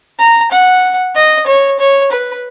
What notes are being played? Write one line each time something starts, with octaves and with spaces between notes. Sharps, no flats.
A#5
F#5
D#5
C#5
C#5
B4